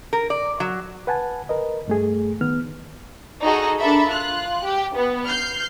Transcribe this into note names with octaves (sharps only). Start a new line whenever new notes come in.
A#4
D5
F#3
B4 F#5 G#5 A5
A#4 B4 D#5
G2 A3 G#4
D#3 B3 F6
D#4 F#4 G#4 A4 D#5
D4 A4 A#4 E5 B5
F4 F#6
G4
B3
F6 G6 C7